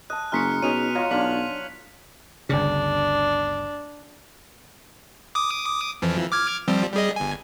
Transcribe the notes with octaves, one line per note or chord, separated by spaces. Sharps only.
D#5 A5 F#6
F#1 G#3 A#5 C#6 F6 B6 C#7
B2 C#4 D#4 G#4 D#7 F7
F4 C#5 D#5 F#5 A#5
B1 D4 F4 A5 B6 F#7
G1 D2 C#3 D4
D6 D#6
F2 E3 F3
D6 F6 G#6
F3 G3 C4
G3 G#4 D#5
G1 G#5